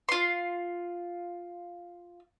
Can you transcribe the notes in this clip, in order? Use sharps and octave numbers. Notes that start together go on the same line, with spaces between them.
F4 C6